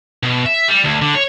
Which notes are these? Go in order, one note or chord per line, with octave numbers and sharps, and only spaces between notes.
B2
E5
G3
D2
D3
C#5